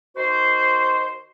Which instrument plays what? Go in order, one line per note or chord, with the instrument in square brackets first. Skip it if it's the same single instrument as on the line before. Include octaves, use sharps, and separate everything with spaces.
[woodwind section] D#3 F#4 C5